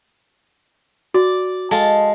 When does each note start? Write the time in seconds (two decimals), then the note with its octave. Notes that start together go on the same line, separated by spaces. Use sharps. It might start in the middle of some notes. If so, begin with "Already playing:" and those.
1.14 F#4 D5
1.71 G#3 A4 F5 A5